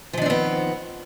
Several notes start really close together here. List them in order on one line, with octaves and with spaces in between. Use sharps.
F3 D#3 D4 C4 B3